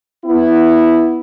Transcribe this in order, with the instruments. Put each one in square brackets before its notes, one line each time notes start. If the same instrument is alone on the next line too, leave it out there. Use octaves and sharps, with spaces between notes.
[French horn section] B3 E4